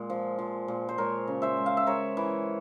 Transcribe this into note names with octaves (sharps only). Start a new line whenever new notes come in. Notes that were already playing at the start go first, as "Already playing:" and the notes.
Already playing: A#2 G#3
F3
F3
A#2
C5
G#3 A#4 C#5
C#3
C5 E5
G#3
F5
E5
G#3 A#4 C#5
E3